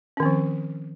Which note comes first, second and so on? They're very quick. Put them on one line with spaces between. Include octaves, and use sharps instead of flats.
C#4 D#3 C4 F3